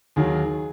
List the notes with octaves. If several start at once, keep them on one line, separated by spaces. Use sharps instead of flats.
D#2 D#3 F#3 G#4